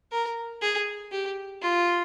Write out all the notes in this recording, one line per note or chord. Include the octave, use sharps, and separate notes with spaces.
A#4
G#4
G4
F4